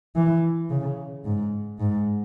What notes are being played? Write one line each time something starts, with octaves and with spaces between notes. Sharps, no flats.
E3
C#3
G#2
G#2